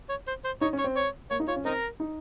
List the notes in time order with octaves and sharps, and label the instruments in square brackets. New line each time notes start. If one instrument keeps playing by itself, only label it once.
[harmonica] C#5
C5
C5
[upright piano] D#4 [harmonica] C#5
[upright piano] C#4
[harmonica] C#5
[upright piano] C4
[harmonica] C#5
[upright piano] A#3 [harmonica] C#5
[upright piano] D#4
[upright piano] F4 [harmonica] C#5
[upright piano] C#4
[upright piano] C4 [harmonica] D#4 A#4
[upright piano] D#4